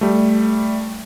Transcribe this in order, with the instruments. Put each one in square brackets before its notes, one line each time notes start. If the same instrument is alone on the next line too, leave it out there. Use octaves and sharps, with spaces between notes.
[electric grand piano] G3 A3